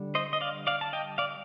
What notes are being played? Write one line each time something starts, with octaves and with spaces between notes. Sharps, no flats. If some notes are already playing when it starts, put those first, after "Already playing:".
Already playing: D3 G3
C5 D#5
D#5
D5 F5
D5 F5
A5
D#5 G5
D5 F5